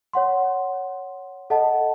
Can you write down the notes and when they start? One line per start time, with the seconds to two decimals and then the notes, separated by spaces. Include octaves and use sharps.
0.13 C#5 F#5 C6
1.50 A4 D#5 F#5 A5